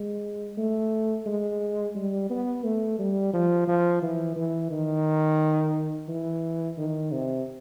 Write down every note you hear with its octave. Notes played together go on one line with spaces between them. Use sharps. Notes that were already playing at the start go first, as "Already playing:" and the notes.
Already playing: G#3
A3
G#3
G3
B3
A3
G3
F3
F3
E3
E3
D#3
E3
D#3
C3